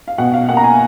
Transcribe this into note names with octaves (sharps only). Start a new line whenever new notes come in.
F5
B2 F#5
F5
A#3 F#5
A#5
G#5